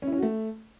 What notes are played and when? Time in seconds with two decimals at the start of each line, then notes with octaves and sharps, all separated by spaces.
0.02 C#4
0.07 E4
0.12 C#4
0.17 F#4
0.22 A3